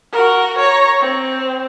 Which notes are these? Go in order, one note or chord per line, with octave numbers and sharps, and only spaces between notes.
F#4 A#4
C#5 A#5
C4